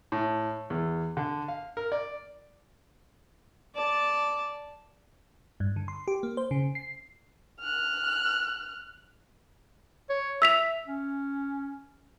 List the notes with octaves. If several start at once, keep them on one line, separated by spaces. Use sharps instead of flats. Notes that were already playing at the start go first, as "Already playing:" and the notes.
A2
E2
D3
F5
A#4
D5
D5 A5
G2
D3
C6
G4
A#3
C5
C#3
C7
F6 F#6
C#5
E5 E6 B6 F7
C#4